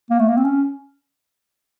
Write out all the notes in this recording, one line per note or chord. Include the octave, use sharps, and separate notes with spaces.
A#3
A3
A#3
C4
C#4